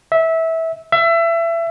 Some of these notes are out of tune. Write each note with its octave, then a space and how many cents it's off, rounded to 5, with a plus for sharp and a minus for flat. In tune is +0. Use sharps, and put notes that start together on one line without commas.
E5 -20
E5 +25